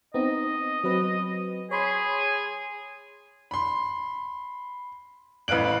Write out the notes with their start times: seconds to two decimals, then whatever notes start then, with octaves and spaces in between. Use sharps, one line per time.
0.14 B3 C4 D#4 D#5
0.84 F#3 C4 B4
1.71 G#4 C#5 B5 C6
3.51 B5 C6
5.48 A1 B4 F5 F#6 D7 F#7